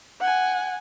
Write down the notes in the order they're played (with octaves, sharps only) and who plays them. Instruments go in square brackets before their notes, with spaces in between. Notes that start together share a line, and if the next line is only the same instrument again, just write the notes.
[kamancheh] F#5 G#5